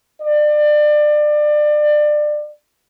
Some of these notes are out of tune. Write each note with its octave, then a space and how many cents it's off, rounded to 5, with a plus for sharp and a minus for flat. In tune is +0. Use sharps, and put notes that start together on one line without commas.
D5 +25